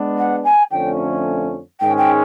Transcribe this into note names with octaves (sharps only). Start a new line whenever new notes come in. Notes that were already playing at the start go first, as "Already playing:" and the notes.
Already playing: G#3 B3 D4
F#5
G#5
F2 D3 F3 A3 C#4 G5
G#2 D#3 G#3 C#4 G5
G5